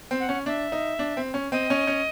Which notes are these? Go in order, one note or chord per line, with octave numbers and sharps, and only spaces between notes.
C4
F#5
C#4
D4 E5
D#4
D4
C4
C#4
C4 D#5
C#4
C#4